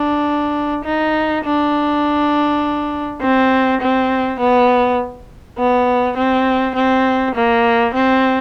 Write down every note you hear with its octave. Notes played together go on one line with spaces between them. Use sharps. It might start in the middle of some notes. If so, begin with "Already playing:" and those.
Already playing: D4
D#4
D4
C4
C4
B3
B3
C4
C4
A#3
C4